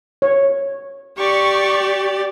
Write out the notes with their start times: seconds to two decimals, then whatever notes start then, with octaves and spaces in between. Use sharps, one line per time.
0.22 C#5
1.18 G4 D5 C#6